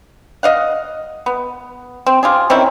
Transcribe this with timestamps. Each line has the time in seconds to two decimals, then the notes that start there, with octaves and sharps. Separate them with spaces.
0.43 D#5 F5 F#5
1.26 B3
2.07 C4
2.23 F4 G4 G#4
2.50 D#3 C4 C#4 E4